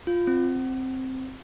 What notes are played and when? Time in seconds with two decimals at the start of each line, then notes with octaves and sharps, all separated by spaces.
0.07 F4
0.27 C4